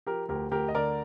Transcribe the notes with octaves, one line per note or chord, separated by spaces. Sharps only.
F3 G4 A#4
D2 G4 A#4
D2 G4 A#4
D#5
D3 A#4 D5